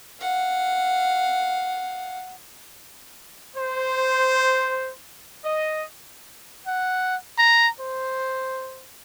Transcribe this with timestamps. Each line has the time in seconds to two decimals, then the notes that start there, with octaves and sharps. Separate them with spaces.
0.20 F5 F#5
3.56 C5
5.44 D#5
6.67 F#5
7.38 A#5
7.80 C5